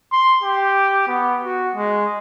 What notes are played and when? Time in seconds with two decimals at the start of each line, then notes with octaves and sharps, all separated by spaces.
0.12 C6
0.43 G4
1.08 B3
1.44 F#4
1.76 G#3